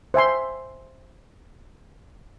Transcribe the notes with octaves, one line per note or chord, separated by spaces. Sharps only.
C5 E5 G#5 C6